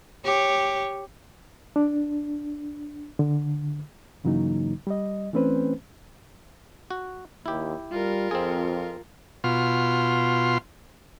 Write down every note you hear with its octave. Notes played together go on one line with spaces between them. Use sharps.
G4 C#5
D4
D3
G2 C#3 E3 F#3 A#3 D#4
G3 D#5
E3 A3 C4 C#4 B4 C5
F#4
D#2 E4 G4
G3 F4 A#4
F2 C4 G#4
B2 F4 C6 F6